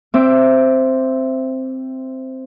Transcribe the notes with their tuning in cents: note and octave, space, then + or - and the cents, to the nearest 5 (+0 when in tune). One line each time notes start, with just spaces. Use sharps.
C4 +0 E5 +15 D6 +0